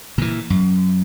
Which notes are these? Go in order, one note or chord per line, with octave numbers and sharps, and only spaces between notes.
A#2 E3
F#2